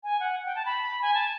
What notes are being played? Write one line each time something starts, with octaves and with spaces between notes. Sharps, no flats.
G#5
F#5
G5
A5
B5
G#5
A5